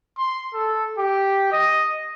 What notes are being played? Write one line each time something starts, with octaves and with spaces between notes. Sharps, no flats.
C6
A4
G4
D#5